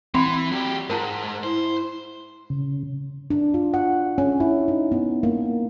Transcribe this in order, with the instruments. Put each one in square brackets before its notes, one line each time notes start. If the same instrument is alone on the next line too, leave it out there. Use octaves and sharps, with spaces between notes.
[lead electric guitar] E3 [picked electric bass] C4 [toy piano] F#5 B5 C6
[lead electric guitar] F#3 G4
[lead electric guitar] G#2 [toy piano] A#4 A5 A#5
[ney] E4 [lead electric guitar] C5
[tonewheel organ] C#3
[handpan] D4
F4
F#5
C#4
E4
D#4
B3
A#3